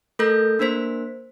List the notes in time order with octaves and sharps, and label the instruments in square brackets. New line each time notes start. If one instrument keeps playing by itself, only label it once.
[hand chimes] A3 A4 A#4 G6 A#6
A#3 D4 A#4 C5 B6